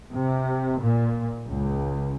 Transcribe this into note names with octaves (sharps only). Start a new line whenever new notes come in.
C3
A#2
C#2